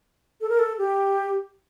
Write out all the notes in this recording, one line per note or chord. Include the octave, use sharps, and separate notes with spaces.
A4
A#4
A4
G4